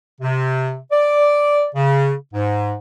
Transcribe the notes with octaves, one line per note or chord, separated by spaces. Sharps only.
C3
D5
C#3
G#2